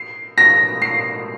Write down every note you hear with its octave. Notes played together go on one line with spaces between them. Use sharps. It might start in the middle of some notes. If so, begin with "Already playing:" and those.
Already playing: C7
A#6
C7